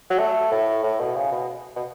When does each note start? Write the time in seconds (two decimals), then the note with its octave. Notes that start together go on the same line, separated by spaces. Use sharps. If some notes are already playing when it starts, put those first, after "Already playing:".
0.10 F#3
0.19 A3
0.51 A2
0.83 A2
0.99 B2
1.16 C#3
1.32 B2
1.76 B2